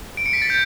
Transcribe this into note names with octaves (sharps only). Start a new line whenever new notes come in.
D7
C#7
B6
A6
G6